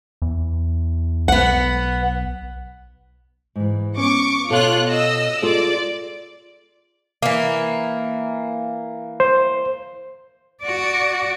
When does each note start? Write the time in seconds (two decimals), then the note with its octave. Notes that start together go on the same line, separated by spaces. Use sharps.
0.22 E2
1.28 B1 B3 F#5
3.56 G#2 E3
3.97 B3 C#4 C#6 D6
4.50 B2 F4 A4 C#5 F#6
4.86 D#5 E6
5.42 F4 G#4 A4 D5
7.22 E3 A#3
9.20 C5
10.62 F#4 D5